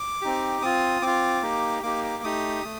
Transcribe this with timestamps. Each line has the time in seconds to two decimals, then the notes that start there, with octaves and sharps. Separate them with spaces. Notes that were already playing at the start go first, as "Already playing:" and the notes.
Already playing: D6
0.22 C4 D#4 G4
0.62 C4 F4 D#6
1.02 C4 F4 D6
1.42 A#3 D#4 G4
1.83 A#3 D#4 G4 D6
2.04 D6
2.23 A3 D#4 G4 D#6
2.64 A3